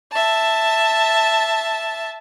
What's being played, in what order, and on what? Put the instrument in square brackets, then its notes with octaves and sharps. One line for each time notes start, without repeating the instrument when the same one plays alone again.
[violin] E5 A5